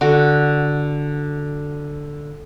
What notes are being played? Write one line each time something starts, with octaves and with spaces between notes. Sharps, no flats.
D3 F#4